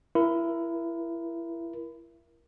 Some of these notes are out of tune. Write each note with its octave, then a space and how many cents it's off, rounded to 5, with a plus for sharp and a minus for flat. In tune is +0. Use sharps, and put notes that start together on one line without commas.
E4 +25 A#4 +25